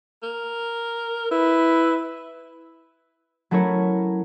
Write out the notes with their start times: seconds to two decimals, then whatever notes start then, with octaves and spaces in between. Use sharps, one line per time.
0.23 A#4
1.31 E4 B4
3.51 F#3 A3 C#4 E4 A#4 C#5